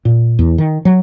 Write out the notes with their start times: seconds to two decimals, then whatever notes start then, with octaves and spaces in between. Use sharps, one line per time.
0.05 A#2
0.39 E2
0.58 D#3
0.85 F#3